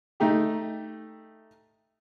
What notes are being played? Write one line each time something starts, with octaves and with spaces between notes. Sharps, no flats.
A3 D#4 G4